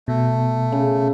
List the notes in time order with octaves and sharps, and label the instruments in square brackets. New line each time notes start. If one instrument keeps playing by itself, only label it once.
[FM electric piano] B2 [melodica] A3
[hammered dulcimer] C#3